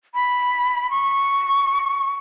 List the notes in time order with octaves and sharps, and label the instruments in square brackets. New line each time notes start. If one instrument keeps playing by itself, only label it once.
[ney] B5
C#6